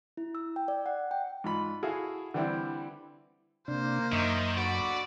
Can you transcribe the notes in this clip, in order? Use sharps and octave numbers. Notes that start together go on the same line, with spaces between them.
E4
E6
G5
D5
F#5
G5
G#2 F4 B5
E4 F#4 G#4 A4 F5
D3 E3 G3 C4 E4
C3 A#3 D4 C5
F#2 D#3 D#4 E5 C#6
D3 F#4 D5 B5